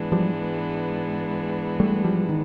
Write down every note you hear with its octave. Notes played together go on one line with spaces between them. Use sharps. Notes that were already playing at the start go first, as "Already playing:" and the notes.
Already playing: G#2 E3 G#3 B3 D4
F3 G3
G3 A3
F3 G3
D#3